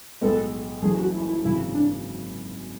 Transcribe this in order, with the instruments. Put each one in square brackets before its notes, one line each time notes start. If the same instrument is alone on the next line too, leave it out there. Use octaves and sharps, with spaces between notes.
[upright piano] B1 A2 G#3 B3 [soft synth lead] A4
[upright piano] F#1 F#2 E3 A3 E4 [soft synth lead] G#4
[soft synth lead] F#4
E4
E4
[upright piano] G#1 F#2 C#3 E3 [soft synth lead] E4
[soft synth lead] D4